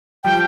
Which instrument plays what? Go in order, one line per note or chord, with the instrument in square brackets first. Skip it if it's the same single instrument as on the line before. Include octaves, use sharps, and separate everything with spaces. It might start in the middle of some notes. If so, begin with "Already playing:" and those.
[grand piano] F3 G3 [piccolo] G5